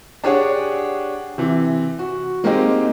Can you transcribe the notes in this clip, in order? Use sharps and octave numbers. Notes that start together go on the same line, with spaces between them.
D4 G4 G#4 C#5 D5 F#5
C3 E3
F#4
G#3 A#3 C4 D#4 G4 D#5